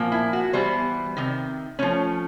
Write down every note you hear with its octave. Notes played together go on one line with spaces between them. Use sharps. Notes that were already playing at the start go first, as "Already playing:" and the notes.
Already playing: A#2 F3 A#3
E4
F#4
E3 G3 B3 C5
C3 D#3
F3 A3 C#4